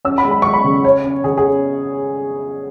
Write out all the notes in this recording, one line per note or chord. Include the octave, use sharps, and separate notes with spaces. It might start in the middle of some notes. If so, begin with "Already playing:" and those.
C#4 E6
B5
G#3
B5
G#3 C#6
B5
C#3
C#4 C#5
C#4
C#3 G#4
G#4